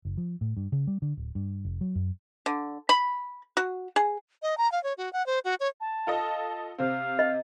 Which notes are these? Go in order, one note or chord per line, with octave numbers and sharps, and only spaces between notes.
F#1
F3
A2
G2
C#3
G3
D3
D1
G2
F1
F#3
F#2
D3
B5
F#4
G#4
D#5
A#5
F5
C#5
F#4
F#5
C5
F#4
C#5
A5
F4 A4 D#5
C3 C4 F5
D#5